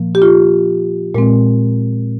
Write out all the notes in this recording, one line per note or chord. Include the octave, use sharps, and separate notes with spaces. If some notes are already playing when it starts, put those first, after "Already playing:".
Already playing: A#2 F3 A#3
G4
F4
A#2 G#3 C4